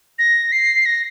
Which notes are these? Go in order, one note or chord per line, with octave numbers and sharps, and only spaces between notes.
A#6
C7
A#6